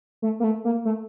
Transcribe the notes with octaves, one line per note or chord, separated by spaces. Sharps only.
A3
A#3
A3
A#3
A3